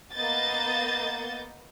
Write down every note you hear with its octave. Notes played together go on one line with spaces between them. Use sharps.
A#3 B3 D#5 G6 A6